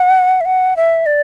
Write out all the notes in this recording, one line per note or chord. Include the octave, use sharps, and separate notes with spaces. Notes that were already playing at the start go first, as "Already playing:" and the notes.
Already playing: F#5
E5
F#5
E5
D5